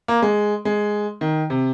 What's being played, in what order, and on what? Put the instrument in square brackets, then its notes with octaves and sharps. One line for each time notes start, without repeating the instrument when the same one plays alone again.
[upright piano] A#3
G#3
G#3
D#3
C3